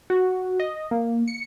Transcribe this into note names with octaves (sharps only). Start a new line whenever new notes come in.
F#4
D#5
A#3
C#7